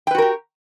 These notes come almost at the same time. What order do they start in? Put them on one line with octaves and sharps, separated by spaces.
G5 B4 F#4 A#4 G4